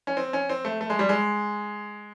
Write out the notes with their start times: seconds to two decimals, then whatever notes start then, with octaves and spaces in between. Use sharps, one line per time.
0.07 C#4
0.17 C4
0.33 C#4
0.49 C4
0.65 A3
0.81 A3
0.90 G#3
0.99 G3
1.09 G#3